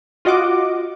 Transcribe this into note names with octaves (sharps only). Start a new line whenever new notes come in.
F4 F#4 D#5 F#5 D6